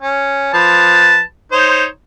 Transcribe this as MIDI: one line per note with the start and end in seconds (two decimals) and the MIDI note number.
0.02 0.53 61
0.54 1.21 53
0.54 1.21 71
0.54 1.21 81
1.52 1.85 63
1.52 1.85 72
1.52 1.85 73